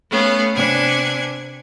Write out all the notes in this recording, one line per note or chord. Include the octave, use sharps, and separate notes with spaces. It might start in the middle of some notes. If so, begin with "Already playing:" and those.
A3 B3 C#4 F5
C3 B3 D4 G#5 F#6 G#6